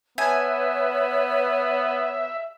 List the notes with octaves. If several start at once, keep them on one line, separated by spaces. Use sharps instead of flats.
B3 B4 C#5 E5 G#5